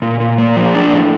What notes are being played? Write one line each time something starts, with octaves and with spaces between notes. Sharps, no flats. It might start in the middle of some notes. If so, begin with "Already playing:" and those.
A#2
A#2
A#3
F3
D4
A2